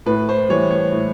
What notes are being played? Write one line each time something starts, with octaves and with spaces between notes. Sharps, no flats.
A2 B4
C5
E3 G3 C#5
C#5
A2